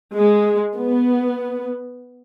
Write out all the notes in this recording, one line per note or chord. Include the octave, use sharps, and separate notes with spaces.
G#3
B3